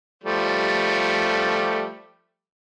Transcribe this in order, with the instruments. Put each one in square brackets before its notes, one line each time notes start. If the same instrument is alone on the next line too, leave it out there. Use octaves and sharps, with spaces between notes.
[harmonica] F3 G3 A3